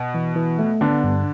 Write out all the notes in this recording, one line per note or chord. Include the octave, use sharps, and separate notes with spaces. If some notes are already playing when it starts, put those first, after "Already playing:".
Already playing: B2 B3
E3
E3
A3
D3 B3 D4
G2